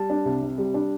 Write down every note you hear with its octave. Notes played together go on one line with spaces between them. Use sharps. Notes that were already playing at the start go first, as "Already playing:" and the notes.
Already playing: G3 A5
D4
C2
C3
G3
D4